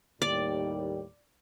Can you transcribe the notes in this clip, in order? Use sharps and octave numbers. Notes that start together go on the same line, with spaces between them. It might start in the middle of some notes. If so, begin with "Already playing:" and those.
D#2 A2 G3 D5